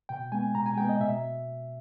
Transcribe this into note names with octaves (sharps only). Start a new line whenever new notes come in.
B2 G5
G#3 B3 G#5
B2 A#5
G#5
G#3 B3 G5
D#5
B2 E5